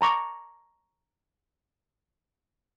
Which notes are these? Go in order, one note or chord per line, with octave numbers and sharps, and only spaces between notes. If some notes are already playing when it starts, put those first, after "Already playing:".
A5 A#5 C#6 D6